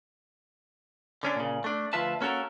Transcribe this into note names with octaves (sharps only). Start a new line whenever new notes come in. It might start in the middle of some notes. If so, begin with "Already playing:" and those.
D3 C#4 D4
A#2 C#3
A3 D4
D2 F3 F4 B4 E5 A5
A#3 C#4 F#4 A4 A#4